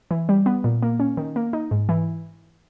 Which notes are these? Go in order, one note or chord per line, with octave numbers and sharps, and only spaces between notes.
E3
G3
B3
A#2
A#3
C#4
D#3
A#3
D#4
G#2
E3